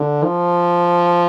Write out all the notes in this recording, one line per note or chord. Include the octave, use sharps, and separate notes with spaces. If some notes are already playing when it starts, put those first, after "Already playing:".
Already playing: D3
F3